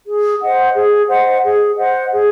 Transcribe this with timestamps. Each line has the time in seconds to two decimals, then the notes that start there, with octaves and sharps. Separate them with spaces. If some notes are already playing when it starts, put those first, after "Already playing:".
0.07 G#4
0.41 C5 D#5 F#5
0.75 G#4
1.10 C5 D#5 F#5
1.44 G#4
1.78 C5 D#5 F#5
2.12 G#4